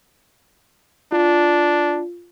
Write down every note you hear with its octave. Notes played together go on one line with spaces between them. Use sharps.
D4 F4